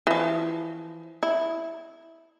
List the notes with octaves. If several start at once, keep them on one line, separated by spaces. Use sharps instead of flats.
E3 F3
E4